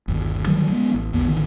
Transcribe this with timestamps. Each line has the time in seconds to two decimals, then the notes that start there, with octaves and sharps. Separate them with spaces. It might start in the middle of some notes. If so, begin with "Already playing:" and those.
0.08 G1 D#2
0.47 D3 D#3 F#3 G3
0.70 F3 G#3 B3
0.94 A1
1.13 A#1 E2 D3 B3
1.27 A1 D3 D#3